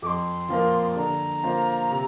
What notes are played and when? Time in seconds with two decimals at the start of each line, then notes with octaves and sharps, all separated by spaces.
0.02 F2 D6
0.06 C6
0.49 F3 A#3 F4 A#4
0.96 D3 A#5
1.43 A#3 F4 C5
1.90 C3